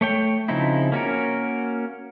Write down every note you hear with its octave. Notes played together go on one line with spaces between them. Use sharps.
A3 C#5 G5
C#3 F3 C4 D#4 E4
A#3 C#4 F#4 A#4